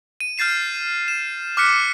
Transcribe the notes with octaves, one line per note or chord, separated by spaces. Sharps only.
D#7
F6 G6 A6 C7 E7
E7
D6 F6 F#6 B6 C#7